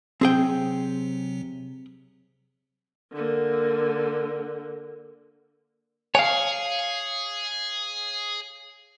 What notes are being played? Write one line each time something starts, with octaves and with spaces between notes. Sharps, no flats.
C3 F#3 C4 G#4 G5
D3 A#3
G#4 C#5 F5 G#5